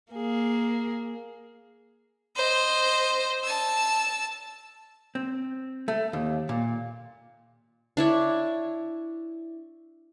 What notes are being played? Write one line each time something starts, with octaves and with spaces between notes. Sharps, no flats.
A#3 G#4
C5 D#5
A5 E6
C4
A3
D#2
A#2
D4 E4 C#5